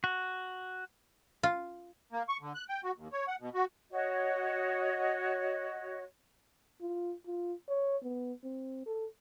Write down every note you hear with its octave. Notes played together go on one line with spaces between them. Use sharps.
F#4
F4
A#3
C#6
D3
F#6
G5
F#4
D#2
C#5
F#5
B2
F#4
F#4 C#5 D#5
F4
F4
C#5
B3
C4
A4